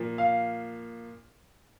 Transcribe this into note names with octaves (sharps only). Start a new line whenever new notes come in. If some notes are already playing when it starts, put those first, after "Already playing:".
Already playing: A#2 F3
F5